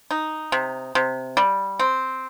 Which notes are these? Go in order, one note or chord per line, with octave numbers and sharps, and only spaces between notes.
D#4
C3
C3
G3
C4